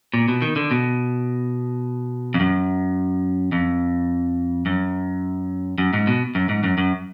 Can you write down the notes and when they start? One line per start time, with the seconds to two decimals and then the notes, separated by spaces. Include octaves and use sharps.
0.14 A#2
0.28 B2
0.42 D#3
0.56 D3
0.71 B2
2.34 F2
2.40 F#2
3.52 F2
4.66 F#2
5.78 F#2
5.93 G#2
6.07 B2
6.35 F#2
6.49 G#2
6.63 F#2
6.78 F#2